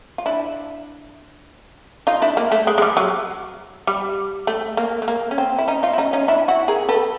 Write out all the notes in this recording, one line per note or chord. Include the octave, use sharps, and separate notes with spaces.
F4
D4 E4
D#4 F4
D4 E4
A#3
A3
G#3
G#3
G3
F#3
G3
A3
A#3
A3
A#3
C#4
C4
E4
C#4 D#4
D#4 F4
E4
C#4 D#4
C#4 D#4
D4 E4
E4 F#4
G#4 A#4
A4 B4